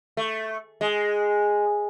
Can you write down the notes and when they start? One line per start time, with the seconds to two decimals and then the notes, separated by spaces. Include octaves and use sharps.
0.17 A3
0.81 G#3